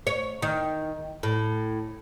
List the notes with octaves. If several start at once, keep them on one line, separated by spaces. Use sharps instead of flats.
C#5
D#3
A2